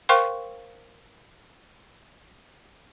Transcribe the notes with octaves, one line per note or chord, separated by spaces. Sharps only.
A#4 C5 F5 G5 C6 C#6